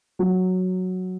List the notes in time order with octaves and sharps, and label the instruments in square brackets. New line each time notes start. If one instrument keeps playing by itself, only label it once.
[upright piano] F#3